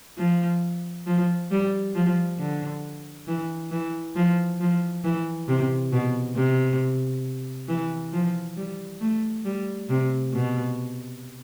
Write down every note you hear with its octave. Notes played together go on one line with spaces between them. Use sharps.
F3
F3
G3
F3
D3
E3
E3
F3
F3
E3
C3
B2
C3
E3
F3
G3
A3
G3
C3
B2